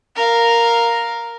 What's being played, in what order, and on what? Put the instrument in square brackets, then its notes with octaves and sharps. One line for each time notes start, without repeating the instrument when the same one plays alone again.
[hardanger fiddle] A#4 F5